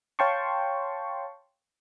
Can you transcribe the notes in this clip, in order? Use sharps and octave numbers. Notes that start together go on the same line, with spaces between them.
C#5 F5 G5 A5 C6 C#6